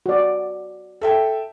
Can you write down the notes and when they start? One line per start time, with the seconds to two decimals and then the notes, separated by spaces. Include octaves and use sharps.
0.06 F#4 D5
1.01 A4 E5 G5